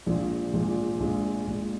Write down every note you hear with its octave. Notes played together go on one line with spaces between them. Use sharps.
A#1 A#2 F3 G#3
A#1 A#2 F3 G#3
A#1 A#2 F3 G#3
A#1 A#2 F3 G#3